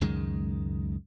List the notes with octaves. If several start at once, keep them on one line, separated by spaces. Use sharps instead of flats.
C#2 F#2 D#3 G#3